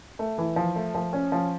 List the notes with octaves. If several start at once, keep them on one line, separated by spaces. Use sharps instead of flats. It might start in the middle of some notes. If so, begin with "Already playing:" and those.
A3
E3
F3
A3
F3
C#4
F3